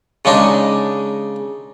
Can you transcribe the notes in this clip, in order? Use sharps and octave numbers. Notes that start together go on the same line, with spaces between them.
C#3 G#3 D4 D#4